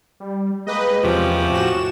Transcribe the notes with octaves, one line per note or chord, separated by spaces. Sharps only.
G3
G#3 A#3 G4 B4 D#5
E2 C3 F3 C#4 G4 D6
A2 F#4 E7